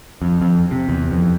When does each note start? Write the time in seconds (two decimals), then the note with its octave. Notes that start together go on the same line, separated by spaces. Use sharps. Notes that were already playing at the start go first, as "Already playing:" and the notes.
0.22 F2
0.42 F2
0.71 C3
0.89 E2
1.11 F2